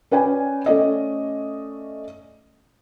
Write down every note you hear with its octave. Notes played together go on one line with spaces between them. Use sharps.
C#4 B4 D5 G5 G#5
A3 C#4 D5 D#5